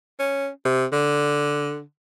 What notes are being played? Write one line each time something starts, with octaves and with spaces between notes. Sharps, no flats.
C#4
C3
D3